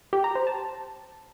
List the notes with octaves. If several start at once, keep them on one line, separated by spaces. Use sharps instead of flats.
G4
A#5
C5
A5